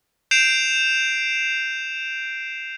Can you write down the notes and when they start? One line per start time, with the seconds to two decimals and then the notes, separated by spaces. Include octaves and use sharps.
0.31 G6 C7 D7 E7 F7